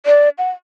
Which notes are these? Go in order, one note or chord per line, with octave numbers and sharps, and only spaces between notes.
D5
F#5